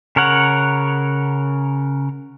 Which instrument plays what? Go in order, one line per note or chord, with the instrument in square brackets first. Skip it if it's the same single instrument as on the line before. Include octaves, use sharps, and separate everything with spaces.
[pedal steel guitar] C#3 A#4 C#5 F#5